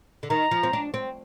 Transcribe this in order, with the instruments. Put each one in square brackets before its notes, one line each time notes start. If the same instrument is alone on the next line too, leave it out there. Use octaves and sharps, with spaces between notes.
[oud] D3
[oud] D#3 [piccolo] A#5
[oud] F3
C4
D4
C4